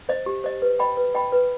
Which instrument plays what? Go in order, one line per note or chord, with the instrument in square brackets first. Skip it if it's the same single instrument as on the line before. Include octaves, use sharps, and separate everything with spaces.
[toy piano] C5 D#5
G4
C5 D#5
B4
D#5 G5 B5
B4
D#5 G5 B5
B4